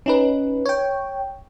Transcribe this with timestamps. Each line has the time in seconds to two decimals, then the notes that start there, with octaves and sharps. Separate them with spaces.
0.06 C#4 D#4 B4
0.65 C#5 G5